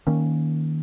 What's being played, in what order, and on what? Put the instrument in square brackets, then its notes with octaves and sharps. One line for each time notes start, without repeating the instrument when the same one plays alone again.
[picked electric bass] D#3 A#3 C#4